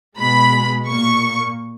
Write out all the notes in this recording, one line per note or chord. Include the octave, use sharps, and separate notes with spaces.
B2 G#3 B5
A#2 A#3 C#6